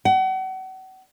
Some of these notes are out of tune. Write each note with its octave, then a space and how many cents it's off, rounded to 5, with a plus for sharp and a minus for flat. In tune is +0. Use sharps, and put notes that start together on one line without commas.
F#5 +35